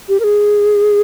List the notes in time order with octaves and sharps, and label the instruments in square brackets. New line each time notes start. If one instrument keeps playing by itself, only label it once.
[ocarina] G4
A#4
G#4